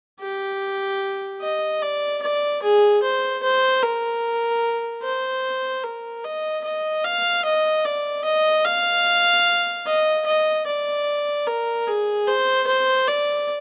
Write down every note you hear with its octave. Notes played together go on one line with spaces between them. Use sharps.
G4
D#5
D5
D5
G#4
C5
C5
A#4
C5
A#4
D#5
D#5
F5
D#5
D5
D#5
F5
D#5
D#5
D5
A#4
G#4
C5
C5
D5